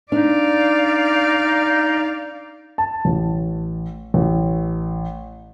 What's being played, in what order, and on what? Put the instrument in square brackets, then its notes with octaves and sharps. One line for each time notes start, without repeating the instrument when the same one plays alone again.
[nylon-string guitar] D4 [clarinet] D#4 [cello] D5 F5
[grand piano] A5
A1
A1